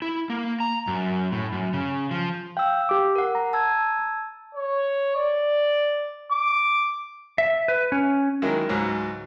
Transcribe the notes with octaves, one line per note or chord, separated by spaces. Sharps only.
E4
A#3
A#5
F#2
A2
F#2
C#3
F3
F5 G5 E6
G4 D6
A#4 F#5
A#5
A5 E6 G#6
C#5
D5
D6
E5
B4
C#4
D#3 F#3 G#3 A#3 E4
C#2 G#2 F#3 F#4 A#5